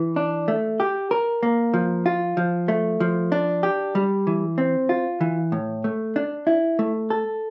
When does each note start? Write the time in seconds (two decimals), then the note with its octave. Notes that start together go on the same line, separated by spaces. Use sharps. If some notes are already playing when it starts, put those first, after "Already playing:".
Already playing: E3
0.16 D4
0.48 A3
0.80 G4
1.11 A#4
1.43 A#3
1.74 F3
2.06 F4
2.37 F3
2.68 A3
3.00 F3
3.32 D4
3.63 G4
3.95 G3
4.27 E3
4.58 C4
4.89 F4
5.21 E3
5.52 A2
5.84 A3
6.16 D4
6.47 E4
6.79 A3
7.10 A4